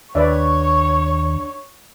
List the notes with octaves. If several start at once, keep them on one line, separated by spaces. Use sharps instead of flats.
D#2 D4 B4 C#5 D5 E5 C#6